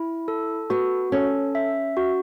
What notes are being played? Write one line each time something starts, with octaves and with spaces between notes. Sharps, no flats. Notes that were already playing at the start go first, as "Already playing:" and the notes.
Already playing: E4
A4
B3 F#4
C#4 A4
E5
F#4